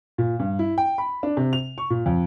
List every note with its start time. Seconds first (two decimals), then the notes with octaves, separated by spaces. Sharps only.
0.18 A#2
0.40 G2
0.59 E4
0.78 G5
0.98 B5
1.23 D4
1.37 C3
1.53 F7
1.78 C#6
1.90 A#2
2.06 F2